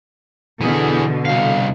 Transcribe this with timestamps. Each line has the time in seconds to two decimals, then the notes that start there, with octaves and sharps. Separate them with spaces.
0.61 B2 D3 E3 G#4
1.25 C2 F5